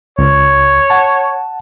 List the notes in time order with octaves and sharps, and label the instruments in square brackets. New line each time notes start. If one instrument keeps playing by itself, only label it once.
[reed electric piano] C#2 [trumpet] C#5
[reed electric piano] F#5 A5